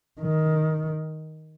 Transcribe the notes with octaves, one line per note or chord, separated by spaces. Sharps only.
D#3